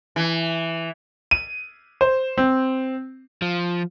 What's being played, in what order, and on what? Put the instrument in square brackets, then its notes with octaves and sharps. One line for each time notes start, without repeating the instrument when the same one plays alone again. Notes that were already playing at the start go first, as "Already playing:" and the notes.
[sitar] E3
[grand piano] D#7
C5
C4
[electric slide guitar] F3